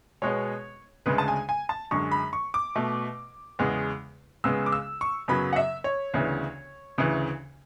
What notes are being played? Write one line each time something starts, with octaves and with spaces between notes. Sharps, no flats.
B2 G#3 B3 C#5
D2 C#3 G#3 B4
A5
G#5
G#5
A5
F#2 D3 G#3 C#6
B5
C#6
D6
B2 A3
E2 C#3 G#3 B3
C#2 C#3 G#3 B3 E6
D6
E6
C#6
F#2 C#3 F#3 B3 B5
F#5
E5
C#5
D2 C#3 E3 B3
D2 C#3 E3